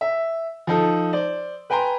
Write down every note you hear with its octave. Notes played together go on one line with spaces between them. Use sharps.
E5
F3 D#4 A4
C5 D5
B4 G5 G#5 A#5 C6